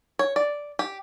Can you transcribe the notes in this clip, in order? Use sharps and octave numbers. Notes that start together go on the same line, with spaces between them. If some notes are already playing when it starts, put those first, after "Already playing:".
C#5
D5
G4